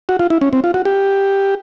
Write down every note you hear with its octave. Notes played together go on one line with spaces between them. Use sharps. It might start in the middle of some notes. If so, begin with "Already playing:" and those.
F#4
F4
E4
C#4
C4
F4
F#4
G4